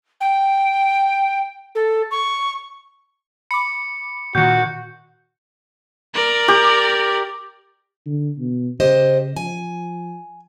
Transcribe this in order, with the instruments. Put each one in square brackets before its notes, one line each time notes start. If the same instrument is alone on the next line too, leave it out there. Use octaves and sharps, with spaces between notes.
[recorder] G5
A4
C#6
[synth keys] B5 D6 [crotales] C#7
[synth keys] A#2 D#3 [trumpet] F#4 [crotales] G6 C#7
[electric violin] A#4 D5
[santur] G4
[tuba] D3
B2
[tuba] C#3 [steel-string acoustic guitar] G4 C5 D#5
[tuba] F3 [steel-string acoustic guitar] G#5